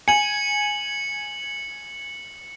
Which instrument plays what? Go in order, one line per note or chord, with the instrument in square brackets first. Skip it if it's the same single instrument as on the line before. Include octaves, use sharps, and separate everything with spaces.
[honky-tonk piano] G#5 [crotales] C#7 F#7